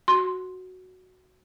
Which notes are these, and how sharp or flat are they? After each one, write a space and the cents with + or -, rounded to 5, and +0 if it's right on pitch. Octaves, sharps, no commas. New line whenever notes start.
F#4 +0 C6 +0